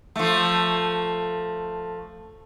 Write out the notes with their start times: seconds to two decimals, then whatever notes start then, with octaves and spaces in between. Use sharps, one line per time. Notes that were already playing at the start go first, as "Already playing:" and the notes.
0.16 F3 A3